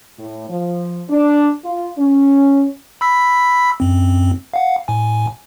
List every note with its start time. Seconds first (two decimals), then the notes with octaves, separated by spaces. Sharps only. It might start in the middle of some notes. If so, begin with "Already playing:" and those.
0.18 A2
0.49 F3
1.10 D4
1.64 F4
1.98 C#4
3.01 B5 E6 B6
3.80 F#2 C4
4.54 F5 F#5
4.88 A2 G#5